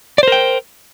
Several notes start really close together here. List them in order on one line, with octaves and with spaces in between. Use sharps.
D5 C5 A#4 G5